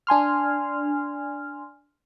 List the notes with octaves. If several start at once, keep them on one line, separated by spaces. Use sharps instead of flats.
D4 G#5 C6 F6